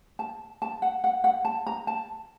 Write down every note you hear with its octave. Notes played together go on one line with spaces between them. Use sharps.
A5
A5
F#5
F#5
F#5
A5
A#5
A5